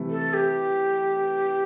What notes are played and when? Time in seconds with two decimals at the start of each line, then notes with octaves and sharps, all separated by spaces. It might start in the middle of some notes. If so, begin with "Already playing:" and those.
Already playing: C3 E3 A3
0.10 A4
0.34 G4